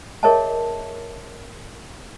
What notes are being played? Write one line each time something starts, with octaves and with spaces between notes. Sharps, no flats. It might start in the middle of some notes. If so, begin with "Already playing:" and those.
G#4 A#4 C#5 D#5 E5 A5